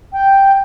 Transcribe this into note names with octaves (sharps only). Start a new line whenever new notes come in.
G5